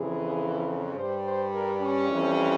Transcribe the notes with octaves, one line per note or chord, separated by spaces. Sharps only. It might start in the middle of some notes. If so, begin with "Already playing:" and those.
Already playing: F2 C#3 E3 G#4
G2 G3 C5
C5
A#4
C#4
F2 E3 G3